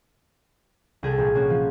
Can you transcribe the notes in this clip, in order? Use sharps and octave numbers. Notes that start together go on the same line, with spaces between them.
C2 G#4 A4 G6
A#1
A#3 C#4 F#4
F3